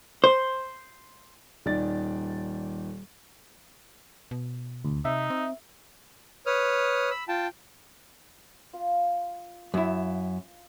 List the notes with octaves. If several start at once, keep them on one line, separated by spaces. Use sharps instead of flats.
C5
D#1 D#3 D5 A6
B2
D2
C3 D#4 E5
C4
B4 C#5 D#6 F6
B5 E6
F4 G5 A5
F4 F5
F#2 E4